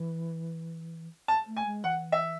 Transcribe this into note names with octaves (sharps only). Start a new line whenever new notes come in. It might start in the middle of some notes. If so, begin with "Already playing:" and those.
Already playing: E3
A5
A3
G#5
G#3
E3 F#5
E5